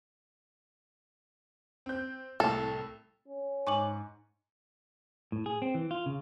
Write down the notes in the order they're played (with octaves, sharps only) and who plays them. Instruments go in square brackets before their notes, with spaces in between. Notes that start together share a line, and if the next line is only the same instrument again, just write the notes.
[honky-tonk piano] C4 G6
[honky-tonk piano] C2 A2 [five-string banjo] A4
[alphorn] C#4
[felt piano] G#2 C#6 [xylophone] G#5 D6 F#7
[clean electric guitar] A2
G#4
C4
E3
F4
C#3